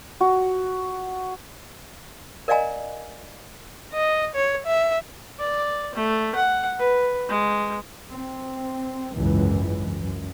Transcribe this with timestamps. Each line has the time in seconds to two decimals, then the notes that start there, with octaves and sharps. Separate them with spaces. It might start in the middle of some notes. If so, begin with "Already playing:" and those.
0.21 F#4
2.48 A#4 D5 D#5 F5 G#5 A#5
3.94 D#5
4.35 C#5
4.66 E5
5.39 D5
5.95 A3
6.35 F#5
6.79 B4
7.29 G#3
8.13 C4
9.16 G#1 C#2 F#2 E3
10.01 F#2